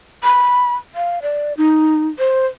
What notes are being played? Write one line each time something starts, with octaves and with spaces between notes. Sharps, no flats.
B5
F5
D5
D#4
C5